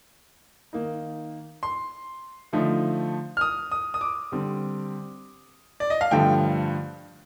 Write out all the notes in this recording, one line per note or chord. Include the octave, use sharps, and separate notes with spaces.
D#3 A#3 D#4
C6
D3 F3 A3 D#4
F6
D#6
D#6
D#6
D6
D3 G3 C4
D5
D#5
F5
G2 D3 F3 A3 G5